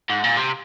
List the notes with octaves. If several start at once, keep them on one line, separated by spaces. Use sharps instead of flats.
G#2
A#2
C3